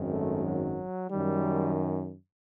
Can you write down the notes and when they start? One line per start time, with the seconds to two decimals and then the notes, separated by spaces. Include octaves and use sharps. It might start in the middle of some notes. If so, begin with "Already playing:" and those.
Already playing: G#1 F#2 D#3
0.12 A3
0.44 F#3
1.09 F#2 D#3 G3